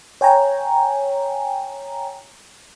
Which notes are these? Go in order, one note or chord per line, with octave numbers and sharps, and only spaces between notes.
C#5 G5 G#5 A#5